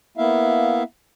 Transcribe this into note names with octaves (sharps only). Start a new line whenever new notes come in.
A#3 B3 E4 E5 F5